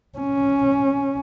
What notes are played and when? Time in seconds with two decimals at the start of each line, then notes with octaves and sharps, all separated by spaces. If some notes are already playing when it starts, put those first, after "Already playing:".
0.19 C#4